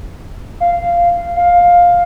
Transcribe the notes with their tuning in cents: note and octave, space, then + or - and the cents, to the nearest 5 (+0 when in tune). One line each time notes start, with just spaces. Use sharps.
F5 -10
F5 +10